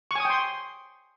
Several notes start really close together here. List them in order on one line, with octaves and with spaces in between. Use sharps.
C#6 G#5 D#6 G5 C6